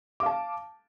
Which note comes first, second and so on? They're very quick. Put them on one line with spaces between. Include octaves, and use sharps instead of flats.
D6 F5 A5